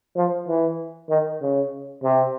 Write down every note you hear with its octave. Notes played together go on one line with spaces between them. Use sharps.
F3
E3
D#3
C#3
C3